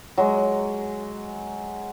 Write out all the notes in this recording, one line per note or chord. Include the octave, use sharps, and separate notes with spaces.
F#3 G#3